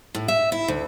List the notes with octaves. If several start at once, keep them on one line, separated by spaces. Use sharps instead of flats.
A2
E5
E4
D2